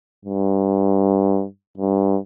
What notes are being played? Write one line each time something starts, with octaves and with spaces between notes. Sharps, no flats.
G2
G2